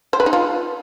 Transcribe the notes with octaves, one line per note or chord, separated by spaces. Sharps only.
C5
B4
D#4
F4